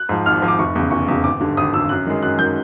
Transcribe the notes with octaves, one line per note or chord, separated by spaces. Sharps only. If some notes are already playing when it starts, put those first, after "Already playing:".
Already playing: F#6
G#2 F3
G#1 F6
G#2 F3
D6
F1 C#6
E2 C#3
F1 C#6
E2 C#3
G#1 D6
G2 D3
G#1 D#6
G2 D3 E6
F#2 F#6
D#3 G#3
F#2 F#6
D#3 G#3 G6